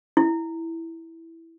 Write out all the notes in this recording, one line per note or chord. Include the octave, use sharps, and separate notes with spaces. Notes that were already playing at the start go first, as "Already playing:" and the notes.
E4